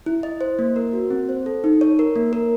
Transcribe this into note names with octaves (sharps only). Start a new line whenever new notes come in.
E4
D#5
C5
A#3
A#4
F#4
C4
C5
A4
D#4
C#5
A#4
A#3
A#4